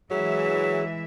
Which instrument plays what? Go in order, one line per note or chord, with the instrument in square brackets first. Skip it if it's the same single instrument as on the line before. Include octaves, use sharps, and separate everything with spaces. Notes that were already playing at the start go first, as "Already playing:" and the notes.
[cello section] E3 G#3 E5 [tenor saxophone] F#3 [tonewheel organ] G#4